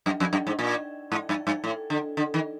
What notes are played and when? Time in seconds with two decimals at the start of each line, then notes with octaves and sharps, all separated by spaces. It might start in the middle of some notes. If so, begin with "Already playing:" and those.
0.06 F#2
0.20 F2
0.33 F#2
0.47 G#2
0.59 A#2
1.12 G#2
1.29 G2
1.47 G2
1.64 A2
1.90 D3
2.17 D3
2.34 D#3